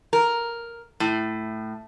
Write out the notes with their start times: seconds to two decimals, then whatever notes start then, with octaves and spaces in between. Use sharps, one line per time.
0.13 A#4
1.00 A2